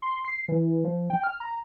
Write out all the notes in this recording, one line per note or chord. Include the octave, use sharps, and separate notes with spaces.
C6
C7
E3
F3
G5
F6
A#5